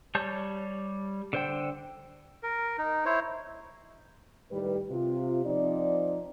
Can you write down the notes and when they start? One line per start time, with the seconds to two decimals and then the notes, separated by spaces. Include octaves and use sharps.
0.15 G3 C#5 A5 G6
1.33 D3 C5 G5
2.43 A#4
2.78 D#4
3.06 E4 C5 C#5
4.51 A2 D#3 G3 G4 B4
4.91 C3 F4
5.45 F3 C4 D#4 D5